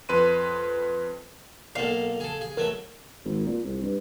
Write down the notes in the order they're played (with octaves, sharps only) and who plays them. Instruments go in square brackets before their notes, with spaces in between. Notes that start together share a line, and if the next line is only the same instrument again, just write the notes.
[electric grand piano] F2 B4 C6 D#7
[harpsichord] B1 A#3 A4 [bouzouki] F5
[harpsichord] G#4 A4
G#4
[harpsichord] F#3 A3 E5 [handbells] A#4
[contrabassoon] G#1
A#2
C2
G2